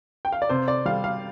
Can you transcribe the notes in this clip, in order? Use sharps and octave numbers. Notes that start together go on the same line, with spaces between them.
G5
F5
D5
C3 C5
D5
G3 F5
F5